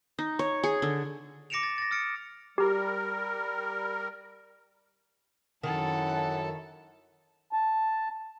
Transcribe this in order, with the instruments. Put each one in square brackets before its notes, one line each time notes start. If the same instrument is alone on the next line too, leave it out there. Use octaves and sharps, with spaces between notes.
[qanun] D#4
C#5
G#4
D3
[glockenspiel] D6 A#6 C#7 D7 E7 F7
A6
A6 A#6
D#6 F6 A6 C#7 D7
[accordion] G3 A#4 [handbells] G4 A#5
[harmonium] F#2 A5 [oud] D#3 [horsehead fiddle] E4 A4 [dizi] F#5
[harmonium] A5